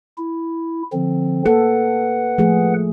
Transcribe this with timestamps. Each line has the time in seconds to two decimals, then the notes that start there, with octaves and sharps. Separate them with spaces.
0.18 E4
0.93 D3 F3 C4
1.46 A#3 A4 B4 F#5
2.38 F3 A3 G#4